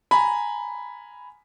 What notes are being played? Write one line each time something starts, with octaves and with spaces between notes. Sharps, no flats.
G#5 A#5 B5